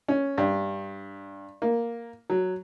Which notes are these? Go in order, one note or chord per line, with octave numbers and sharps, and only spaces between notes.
C#4
G2
A#3
F#3